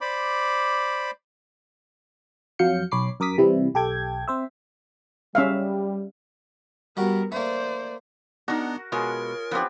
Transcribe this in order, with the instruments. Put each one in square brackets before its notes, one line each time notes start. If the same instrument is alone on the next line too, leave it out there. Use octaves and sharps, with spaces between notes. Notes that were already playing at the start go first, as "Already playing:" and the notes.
[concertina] C5 D5 B5 D6
[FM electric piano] F2 F#3 F5 G6 C#7
B1 C#5 B5 D6 C7
F#2 A#4 D6 D#6 B6
C3 E3 G3 E4
B1 G4 A4 G5 G#6
C4 C5 E5
[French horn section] G3 [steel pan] C#4 E5 F5
[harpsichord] G3 F#4 [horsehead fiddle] B3 A#4
[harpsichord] A3 A#3 [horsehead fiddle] C5 D5
[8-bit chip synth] B3 [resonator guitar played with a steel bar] D4 D#4 [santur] F#4 A#4
[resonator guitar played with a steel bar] B2 G#3 [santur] F4 G#4 C#5 [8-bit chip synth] A#4
[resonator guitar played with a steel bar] F3 D4 [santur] B3 C4 G4